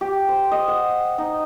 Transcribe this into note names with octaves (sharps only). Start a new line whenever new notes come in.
G4
C5
D#5
F#5
D#4